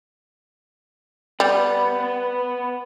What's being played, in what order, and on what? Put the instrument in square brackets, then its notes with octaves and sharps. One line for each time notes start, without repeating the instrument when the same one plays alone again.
[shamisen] G3 [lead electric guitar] B3 B4